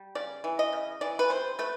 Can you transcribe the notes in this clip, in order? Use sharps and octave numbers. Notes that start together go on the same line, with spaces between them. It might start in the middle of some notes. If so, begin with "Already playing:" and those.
Already playing: G3
C#3 D5
E3
D#5
C#3
E3 D5
B4
C3 C5
A3 B4